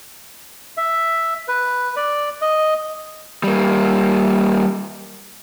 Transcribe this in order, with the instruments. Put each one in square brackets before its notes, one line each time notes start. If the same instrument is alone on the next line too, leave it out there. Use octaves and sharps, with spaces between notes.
[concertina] E5
B4
D5
D#5
[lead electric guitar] G3 A#3